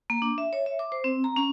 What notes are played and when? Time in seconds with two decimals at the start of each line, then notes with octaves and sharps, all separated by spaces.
0.10 A#3
0.22 D4
0.38 E5
0.53 C#5
0.66 E5
0.79 D6
0.92 C5
1.04 C4
1.24 A#5
1.36 C#4